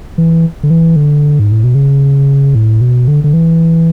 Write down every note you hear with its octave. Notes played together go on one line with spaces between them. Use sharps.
E3
D3
E3
D3
G#2
A2
B2
C#3
A2
B2
D3
D3
E3